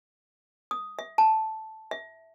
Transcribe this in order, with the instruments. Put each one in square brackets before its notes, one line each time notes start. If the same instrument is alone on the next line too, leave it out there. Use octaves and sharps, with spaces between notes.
[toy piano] D#6
E5
A5
E5